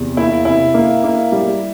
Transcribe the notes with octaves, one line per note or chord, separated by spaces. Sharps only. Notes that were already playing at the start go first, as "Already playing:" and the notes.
Already playing: E2 C3
A#3 E4
C3 E4
A#3
A#3
G3